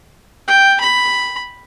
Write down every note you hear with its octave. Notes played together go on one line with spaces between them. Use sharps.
G5
B5